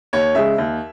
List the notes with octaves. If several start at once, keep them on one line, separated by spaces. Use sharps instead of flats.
D#2 C#5
C#3 G#3 E5
D#2